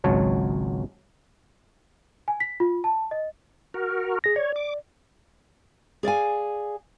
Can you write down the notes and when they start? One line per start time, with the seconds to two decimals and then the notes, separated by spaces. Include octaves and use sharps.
0.04 G#1 C#2 F#3 C#5 A5
2.28 G#5
2.40 B6
2.60 F4
2.84 A5
3.11 D#5
3.74 F#4 A#4
4.24 G#4 A#6
4.36 C#5 D5
4.56 D6
6.03 G#4 D5 F5 G#5